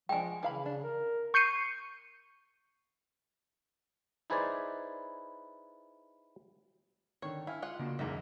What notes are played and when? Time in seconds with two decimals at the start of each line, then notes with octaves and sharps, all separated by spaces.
0.09 F3 G#3 D4 G5 G#5
0.43 C#3 E3 F5 B5
0.66 D4
0.83 A#4
1.34 C#6 G6 C7 C#7 D#7
4.30 D#4 E4 G#4 B4 C5 D5
7.22 D3 D#3 C#5
7.47 E4 F5 G#5 F6
7.62 G#3 F4 F#5
7.79 C#3 A#3 D4 F#4
7.99 F#1 E2 G#2 D#3 A#3 E5